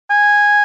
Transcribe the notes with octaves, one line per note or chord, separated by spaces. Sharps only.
G#5